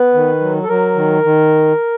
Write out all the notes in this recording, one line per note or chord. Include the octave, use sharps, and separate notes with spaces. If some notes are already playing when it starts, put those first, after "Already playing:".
Already playing: B3 B4
D#3
F#3
A4
F#3 A#4
D#3
D#3